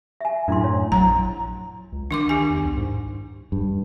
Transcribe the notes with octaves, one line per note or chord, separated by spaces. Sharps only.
E5 G#5
F#2 A2 D4 E4 C6
C#5
A#1 F#3 A#5
C#2
D#3 D4 C6 D6
D4 G4 G#5
E2
C2
G#2
G2